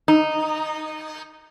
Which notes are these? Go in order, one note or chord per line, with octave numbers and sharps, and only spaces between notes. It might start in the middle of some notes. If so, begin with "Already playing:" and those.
D#4